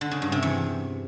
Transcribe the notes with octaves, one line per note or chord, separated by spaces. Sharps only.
D3
C#3
G2
C3
E2